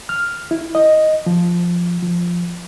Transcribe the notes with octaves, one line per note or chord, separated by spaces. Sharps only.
F6
E4
D#5
F3
F3